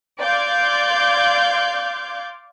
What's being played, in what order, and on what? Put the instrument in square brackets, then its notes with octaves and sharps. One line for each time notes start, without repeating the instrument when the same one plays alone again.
[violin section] D5 F5 C6 D6 G6 G#6